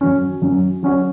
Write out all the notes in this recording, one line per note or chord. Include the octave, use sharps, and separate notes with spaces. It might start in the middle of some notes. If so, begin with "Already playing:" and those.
F#2 F#3 C#4
F#2 F#3 C#4
F#3 C#4 F#4 C#5